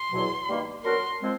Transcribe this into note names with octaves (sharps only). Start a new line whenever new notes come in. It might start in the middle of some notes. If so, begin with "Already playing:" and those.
Already playing: C6
E2 B2 F#3
G2 D#3 G3 A#3
F#3 B3 D4 F#4 A#4 C6
F3 G#3 C4